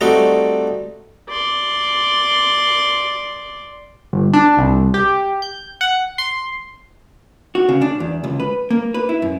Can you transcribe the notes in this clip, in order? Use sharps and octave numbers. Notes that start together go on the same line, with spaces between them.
G3 A3 C4 D#4 F#4 G4
D5 C6
G1
D4
C2
G4
G6
F#5
C6
F#4
C#3
D4
E2
C#2
B4
A#3
B4
E4
F#2